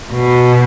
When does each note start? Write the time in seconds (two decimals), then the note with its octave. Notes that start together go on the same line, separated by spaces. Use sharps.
0.13 B2